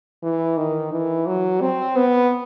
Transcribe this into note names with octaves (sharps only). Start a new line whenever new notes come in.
E3
D#3
E3
F#3
C4
B3